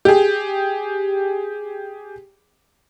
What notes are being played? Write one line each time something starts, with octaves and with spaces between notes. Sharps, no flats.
G4 G#4